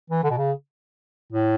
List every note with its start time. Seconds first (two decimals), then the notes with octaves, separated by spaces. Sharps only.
0.10 E3
0.24 D3
0.30 B2
0.37 C#3
1.32 A2